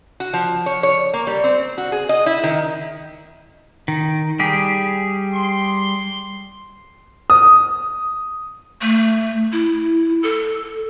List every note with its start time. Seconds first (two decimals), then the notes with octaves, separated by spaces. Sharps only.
0.20 F#4
0.33 F3
0.66 C#5
0.83 C#5
1.14 A#3
1.27 G3
1.44 C4
1.78 F#4
1.92 G#4
2.09 D#5
2.26 E4
2.44 D#3
3.88 D#3
4.39 G3 G4 G#4
5.34 C6
7.30 D#6
8.82 A3
9.52 E4
10.23 A4